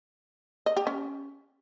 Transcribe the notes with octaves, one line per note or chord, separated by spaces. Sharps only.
D#5
G4
C#4